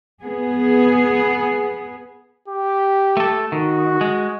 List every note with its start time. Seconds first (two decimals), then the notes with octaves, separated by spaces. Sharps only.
0.22 B3 G#4
2.48 G4
3.17 A3 A4
3.52 D#3 F#4
4.01 G#3